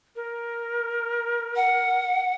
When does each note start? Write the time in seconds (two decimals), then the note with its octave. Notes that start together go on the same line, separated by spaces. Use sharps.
0.16 A#4
1.56 F#5